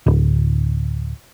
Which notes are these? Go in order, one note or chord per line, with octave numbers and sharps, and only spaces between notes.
D1